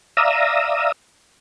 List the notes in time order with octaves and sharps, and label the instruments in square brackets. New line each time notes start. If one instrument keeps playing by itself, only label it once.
[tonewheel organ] D5 E5 F5 A#5 D#6 E6